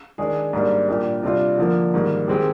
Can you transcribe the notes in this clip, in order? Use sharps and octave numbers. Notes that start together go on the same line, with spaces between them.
D#3 G#3 D4 G#4
G#2 G3 A#3 D4
A#2 G3 D4 G4 A#4
C3 G3 D4 F4
D3 F3 A#3
G#2 D#3 G3 A#3
D#3 G#3 C4 G4